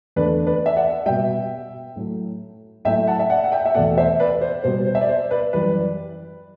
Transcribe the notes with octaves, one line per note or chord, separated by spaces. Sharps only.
E2 D3 A3 B4 D5
B4 D5
E5
D5 F#5
B2 G3 E5 G5
A2 F#3 A3
A2 F#3 A3 E5 G5
F#5 A5
E5
D5 F#5
F#5
E5 G5
E5
E2 B2 A3 D5 F#5
C5 E5
B4 D5
C5
B2 G3 C5
C5
E5
D5
C5
B4 D5
F#2 E3 G3 B4 D5